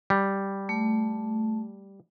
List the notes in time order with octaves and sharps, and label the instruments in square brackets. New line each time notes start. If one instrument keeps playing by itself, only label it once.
[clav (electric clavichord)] G3
[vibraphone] A3